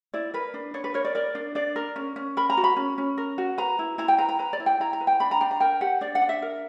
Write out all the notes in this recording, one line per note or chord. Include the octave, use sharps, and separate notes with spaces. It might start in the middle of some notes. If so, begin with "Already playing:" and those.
E4 D5
A#4 B4
D4
D4 C#5
B4
A#4 C#5
D5
A#4 D5
D4
D4 D5
A#4
C#4
C#4
A#4 B5
A#5
F#4
B5
C#4
C#4
A#4
F#4
B4 A#5
E4
E4 A#5
G5
B4 A#5
A#5
B4 A#5
D5
E4
G5
E4 A#5
A#5
B4
G5
D4 B5
A#5
D4 G5
A#5
A#4 G5
G4 F#5
D4 D5
F#5
D4
E5
A#4